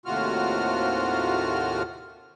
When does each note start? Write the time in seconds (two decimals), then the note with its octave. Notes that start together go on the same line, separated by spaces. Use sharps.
0.06 D#2 A2 C3 F4 F#4 F6